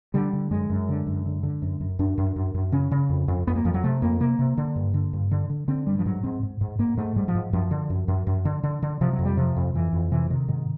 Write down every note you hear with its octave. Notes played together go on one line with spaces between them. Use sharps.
D3 G3
D3
F#2 G#3
F#2
D3
F#2
D3
D3
F#2
F#2
F#2 D4
F#2
F#2
F#2
C#3 C#4
C#3
F2
F2
F2 B3
A#3
F2 F3
F#3
C3 A3
F2 A#3
C3 A#3
C3
D3
G2
D3
G2
D3
D3
D3 C4
G2 G3
F3
G#2 F#3
G#2 C4
G#2
G#2
G#2 A#3
G#2 A3
G#2 G3
F3
G#2
F#2 F3
D3
F#2
F#2
F#2
D3
D3
D3
C3 F3
F#3
F2
G3
C3 F3
F2
F2 E3
F2
C3 E3
C3 D#3
G#2 D#3